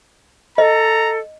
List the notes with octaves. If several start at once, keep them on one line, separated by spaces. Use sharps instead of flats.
A4 D#5 A#5